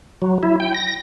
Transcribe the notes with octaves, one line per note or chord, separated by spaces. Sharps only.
F#3
E4
G5
A#6